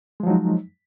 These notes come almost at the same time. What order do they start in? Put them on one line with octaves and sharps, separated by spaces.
G#3 F3 F#3 D#4